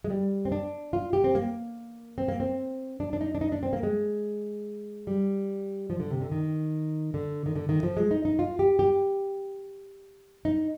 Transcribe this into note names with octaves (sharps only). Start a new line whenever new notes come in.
G#3
G3
C4
D4
F4
G4
C4
A#3
C4
A#3
C4
D4
D4
D#4
D4
D#4
D4
C4
A#3
G#3
G3
F3
D3
C3
D3
D#3
D3
D#3
D3
D#3
F3
G#3
D#4
D#4
F4
G4
G4
D#4